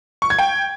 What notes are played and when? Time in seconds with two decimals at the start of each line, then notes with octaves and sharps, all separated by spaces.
0.22 C#6
0.30 G#6
0.39 G5